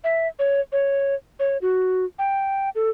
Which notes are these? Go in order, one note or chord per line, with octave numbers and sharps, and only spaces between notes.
E5
C#5
C#5
C#5
F#4
G5
A4